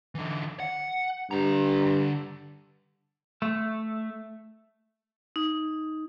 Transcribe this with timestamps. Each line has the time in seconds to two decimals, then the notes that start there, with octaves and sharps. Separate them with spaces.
0.15 D3 E3
0.60 F#5
1.31 G2 D3 A#5
3.42 A3
5.36 D#4